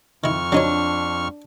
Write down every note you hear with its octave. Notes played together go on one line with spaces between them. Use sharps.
F2 D#3 E4 C#6 F6
F#3 D4 D#4 C#5